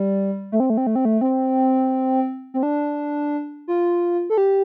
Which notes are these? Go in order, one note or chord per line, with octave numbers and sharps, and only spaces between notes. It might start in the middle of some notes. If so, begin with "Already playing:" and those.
Already playing: G3
A3
C4
A3
C4
A3
C4
A3
C4
C4
D4
F4
A4
G4